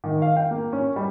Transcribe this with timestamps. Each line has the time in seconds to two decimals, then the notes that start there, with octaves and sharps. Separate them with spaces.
0.04 D#3
0.22 F5
0.37 G5
0.51 A#3
0.73 C#4
0.96 G3